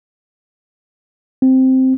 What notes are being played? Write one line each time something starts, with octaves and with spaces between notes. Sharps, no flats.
C4